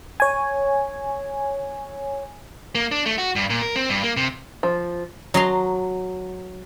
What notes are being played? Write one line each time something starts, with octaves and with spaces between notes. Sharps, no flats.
C#5 G#5
A#3
D4
A3
F#4
G2
A#2
A#4
C4
G2
A#3
C3
F3
F#3 D#5 A5 A#5 C6